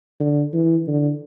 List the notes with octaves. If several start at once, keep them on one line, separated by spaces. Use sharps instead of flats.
D3
E3
D3